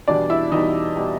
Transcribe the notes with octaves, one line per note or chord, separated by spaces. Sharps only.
E2 B2 G3 D4 D5
E4 E5
E2 B2 G3 D#4 D#5
B2 G3